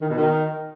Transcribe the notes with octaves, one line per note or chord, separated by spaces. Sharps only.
D#3
B2
D#3